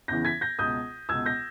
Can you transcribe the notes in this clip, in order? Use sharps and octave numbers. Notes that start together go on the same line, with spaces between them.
E2 C#3 E3 G6 A#6
G#6 B6
G6 A#6
C#2 B2 D#6 G6
C#2 B2 E6 G#6
G6 A#6